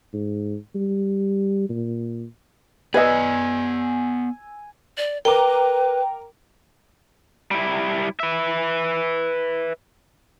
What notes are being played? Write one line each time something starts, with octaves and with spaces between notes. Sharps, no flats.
G#2
G3
A#2
B3 B4 D5 D#5 G#5 E6
D5
A#4 B4 G5 A#5 D6
G3 E4
B4 E5